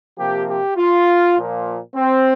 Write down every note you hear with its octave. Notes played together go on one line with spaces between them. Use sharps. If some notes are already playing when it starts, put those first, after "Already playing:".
C3 F3 A#3 G4
G4
F4
A#2 F3 A#3
C4